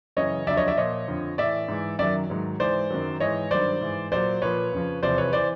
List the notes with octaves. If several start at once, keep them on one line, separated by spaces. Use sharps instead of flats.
F#2 C#3 E3 C#5 D#5
F2 D3 F#3 D5 E5
C#5 D#5
D5 E5
A#2 F3 C#5 D#5
F2 D3 F3
A2 E3 D5 E5
G#2 E3
F#2 D#3 F#3 D5 E5
G#2 D#3 F#3
G#2 E3 C5 D5
F#2 D#3 F#3
G#2 E3 C#5 D#5
G2 D#3 F#3 C5 D5
G#2 E3
A#2 F#3 C5 D5
A#2 F3 B4 C#5
F2 C#3 F3
E2 C3 F3 C5 D5
B4 C#5
E3 C5 D5